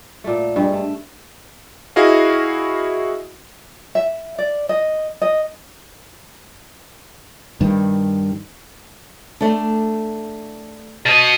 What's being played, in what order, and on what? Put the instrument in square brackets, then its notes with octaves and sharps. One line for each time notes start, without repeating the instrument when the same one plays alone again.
[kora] A#2 A3
G2 G#3
A3
[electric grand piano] E4 F#4 G#4 D#5 F5
[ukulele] E5
D5
D#5
D#5
[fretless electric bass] G2 D#3
[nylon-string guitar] A3 D4
[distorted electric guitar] B2 D#5